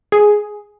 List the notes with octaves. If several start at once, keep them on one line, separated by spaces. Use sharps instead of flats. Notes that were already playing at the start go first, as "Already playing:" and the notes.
G#4